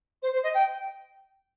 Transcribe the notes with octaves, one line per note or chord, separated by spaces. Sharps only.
C5
C5
D#5
G5